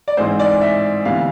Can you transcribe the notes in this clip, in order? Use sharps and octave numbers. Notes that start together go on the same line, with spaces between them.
D5
G#2 E3 G#3 C4 C5
D5
E5
D2 C3 E3 B3 F5